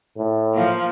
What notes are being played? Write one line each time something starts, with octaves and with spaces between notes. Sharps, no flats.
A2
F3 A#3 F5